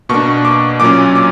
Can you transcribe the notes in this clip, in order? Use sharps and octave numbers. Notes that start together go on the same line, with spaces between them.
B2 A#3 D4 C#6
D6
A#2 F#3 A#3 C#4 D6
D6